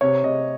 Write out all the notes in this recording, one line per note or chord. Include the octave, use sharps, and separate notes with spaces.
C3 C#5
C3 D#5